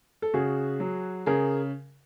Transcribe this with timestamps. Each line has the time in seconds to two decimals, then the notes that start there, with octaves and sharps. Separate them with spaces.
0.22 A4
0.34 C#3 F#4 G#4
0.80 F#3
1.26 C#3 G#4 A#4